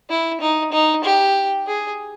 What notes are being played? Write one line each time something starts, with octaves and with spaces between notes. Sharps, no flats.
E4
D#4
D#4
G4
G#4